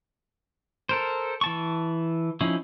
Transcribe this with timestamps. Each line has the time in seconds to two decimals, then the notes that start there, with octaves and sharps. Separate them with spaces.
0.89 A4 A#4 C5
1.41 E3 A5 C#6
2.41 F3 C#4 D#4 E4